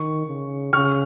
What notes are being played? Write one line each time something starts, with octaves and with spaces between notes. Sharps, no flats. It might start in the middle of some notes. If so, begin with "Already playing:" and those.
Already playing: D#3 C#6
C#3
C#3 C#6 F6